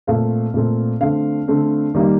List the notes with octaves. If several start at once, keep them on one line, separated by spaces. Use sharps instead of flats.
A#2 A3 C4 F5
A#2 A3 C4
D3 A3 C4 F5
D3 A3 C4
D#3 G3 A#3